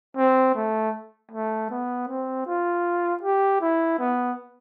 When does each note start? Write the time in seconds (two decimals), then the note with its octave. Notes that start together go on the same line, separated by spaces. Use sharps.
0.17 C4
0.55 A3
1.31 A3
1.70 B3
2.08 C4
2.46 F4
3.22 G4
3.61 E4
3.99 B3